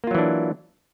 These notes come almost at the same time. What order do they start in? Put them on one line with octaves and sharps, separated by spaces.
A#3 F4 F#3 E3 D4